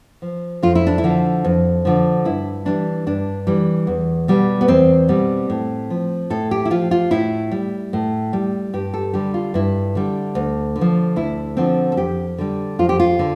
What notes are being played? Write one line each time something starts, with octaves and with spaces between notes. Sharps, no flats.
F3
F2 F4
E4
D4
E4
D3 F3
F2
D3 F3
G2 E4
E3 G3 D4
G2 D4
E3 G3
E2
B2 G3
B3
E2 C4
B2 G3
A2
F3
A2 A4
G4
E4
F3 F4
F4
A2 E4
G3
A2
G3
G2 G4
A4
D3 G3 G4
F4
G2 E4
D3 G3
D2
D3
F3
D2 E4
D3 F3 C4
A4
F2 G4
D3 G3
F2 F4
G4
F4
D3